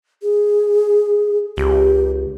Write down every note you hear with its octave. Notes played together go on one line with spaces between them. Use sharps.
G#4
C#2 G4